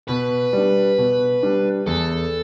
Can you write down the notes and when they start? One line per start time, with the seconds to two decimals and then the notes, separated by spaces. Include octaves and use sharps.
0.09 B2 B4
0.53 G3 D4
0.98 B2
1.43 G3 D4
1.87 E2 A4